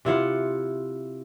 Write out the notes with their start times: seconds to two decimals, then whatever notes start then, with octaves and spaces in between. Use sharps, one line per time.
0.05 C3 E4 F4 F#5